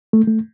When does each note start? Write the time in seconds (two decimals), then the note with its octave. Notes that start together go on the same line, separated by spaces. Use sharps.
0.13 A3
0.27 A3